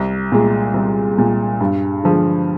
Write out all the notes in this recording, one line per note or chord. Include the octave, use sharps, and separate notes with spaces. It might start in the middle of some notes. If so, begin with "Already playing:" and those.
Already playing: C2
A#2 G#3
C2
A#2 G#3
G2
D3 F3 G#3